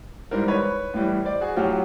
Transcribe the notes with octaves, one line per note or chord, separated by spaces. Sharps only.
G#2 E3 G3 A#4 C5
B4 C#5
A2 E3 G3
C5 D5
F#4 G#4
A2 F#3 F4 G4